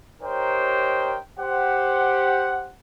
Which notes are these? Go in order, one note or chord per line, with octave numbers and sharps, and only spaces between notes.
D#4 G4 A#4 C5 C#5 G5
G4 C5 F#5